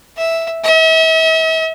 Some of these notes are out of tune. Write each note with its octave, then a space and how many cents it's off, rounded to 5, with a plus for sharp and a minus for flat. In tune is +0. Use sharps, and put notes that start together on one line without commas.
E5 -5
E5 -40